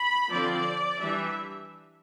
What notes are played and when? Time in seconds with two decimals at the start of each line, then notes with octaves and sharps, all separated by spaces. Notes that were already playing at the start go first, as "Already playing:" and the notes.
Already playing: B5
0.32 D3 F3 C4 D5
1.01 E3 G3 D4 E5